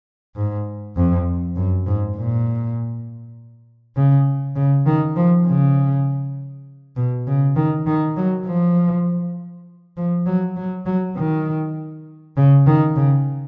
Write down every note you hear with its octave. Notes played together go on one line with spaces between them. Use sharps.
G#2
F2
F#2
G#2
A#2
C#3
C#3
D#3
F3
C#3
B2
C#3
D#3
D#3
F#3
F3
F3
F#3
F#3
F#3
D#3
C#3
D#3
C#3